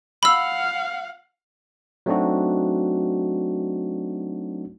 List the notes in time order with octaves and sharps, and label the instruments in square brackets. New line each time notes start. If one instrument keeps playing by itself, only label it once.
[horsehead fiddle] F5 F#5 [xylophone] B5 E6
[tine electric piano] F#3 A3 C4 D4 D#4 F#4